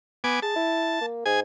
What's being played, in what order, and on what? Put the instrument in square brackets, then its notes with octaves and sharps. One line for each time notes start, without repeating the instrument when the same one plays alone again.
[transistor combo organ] B3 G#5 D6
[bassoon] G#4 [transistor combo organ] A5
[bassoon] E4
A#3
[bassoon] G#2 [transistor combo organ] G#4 G#5